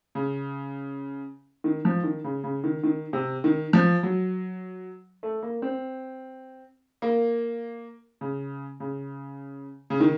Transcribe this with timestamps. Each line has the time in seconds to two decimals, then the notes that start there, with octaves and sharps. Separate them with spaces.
0.15 C#3
1.64 D#3
1.85 F3
2.04 D#3
2.24 C#3
2.44 C#3
2.64 D#3
2.84 D#3
3.13 C3
3.44 D#3
3.73 F3
4.03 F#3
5.23 A3
5.43 A#3
5.62 C4
7.02 A#3
8.21 C#3
8.80 C#3
9.90 C#3
10.00 D#3